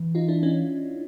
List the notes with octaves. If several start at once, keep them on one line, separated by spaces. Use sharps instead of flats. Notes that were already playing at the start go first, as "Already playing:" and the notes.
Already playing: E3
D#4 F4
D4 E4
C#4 D#4